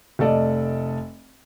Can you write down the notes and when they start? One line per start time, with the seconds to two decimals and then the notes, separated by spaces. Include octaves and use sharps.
0.19 F1 A3 A4 D5 D#5